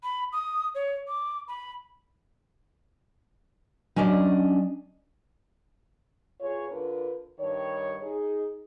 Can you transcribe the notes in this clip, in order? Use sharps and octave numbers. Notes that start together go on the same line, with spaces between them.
B5
D#6
C#5
D6
B5
F#3 C#4 D4 D5 D#5
E2 F4 G#4 C#5
D3 D4 F4 A#4 B4
G2 D#3 G3 C#5
D#4 G#4